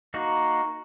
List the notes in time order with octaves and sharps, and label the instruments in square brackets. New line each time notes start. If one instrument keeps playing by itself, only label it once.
[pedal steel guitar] A#3 D#4 F#4